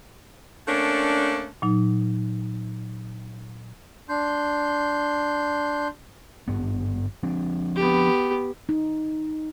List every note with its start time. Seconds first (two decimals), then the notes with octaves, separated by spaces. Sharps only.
0.68 A3 A#3 C#4 D4
1.62 A#2 F#3 D#4
4.09 D4 C6 G6
6.48 G#1 G2 B3
7.23 F3 C4 D4
7.76 B3 G4
8.69 D#4